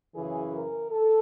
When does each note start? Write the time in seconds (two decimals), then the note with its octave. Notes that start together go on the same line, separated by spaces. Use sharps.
0.14 F#2 C#3 E3 G#4
0.52 A#4
0.90 A4